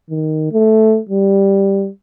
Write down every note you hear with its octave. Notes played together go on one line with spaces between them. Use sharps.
D#3
A3
G3